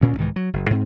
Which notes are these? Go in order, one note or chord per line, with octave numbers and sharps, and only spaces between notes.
D2 A#2 C#4
C2 G#2 D#3 E3
F#3
F#1
G#2 C4